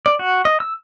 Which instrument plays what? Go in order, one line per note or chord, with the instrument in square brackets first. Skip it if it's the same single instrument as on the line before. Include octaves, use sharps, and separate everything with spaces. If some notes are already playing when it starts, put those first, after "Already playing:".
[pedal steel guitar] D5
F#4
D#5
E6